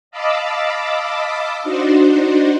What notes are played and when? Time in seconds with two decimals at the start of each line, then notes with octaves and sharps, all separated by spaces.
0.11 D#5 F5 A5 B5 D6 E6
1.63 D4 D#4 F#4 C5